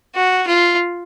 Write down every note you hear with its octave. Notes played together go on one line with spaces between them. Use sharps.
F#4
F4